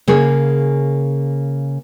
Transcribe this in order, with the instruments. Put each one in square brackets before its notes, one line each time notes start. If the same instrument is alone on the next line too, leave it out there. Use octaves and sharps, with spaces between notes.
[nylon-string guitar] C#3 A#3 G#4 C#5